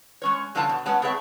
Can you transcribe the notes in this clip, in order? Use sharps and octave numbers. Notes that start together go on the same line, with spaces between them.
G#3 C#4 C#5
G2 D3 F3 C#4 F4 A5
B2
F#3 G#3 B3 C#4 F#5 A5
B3 C4 G#4 C#5 E5